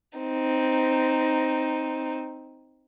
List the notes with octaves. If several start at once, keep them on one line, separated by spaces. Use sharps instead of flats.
C4 D#4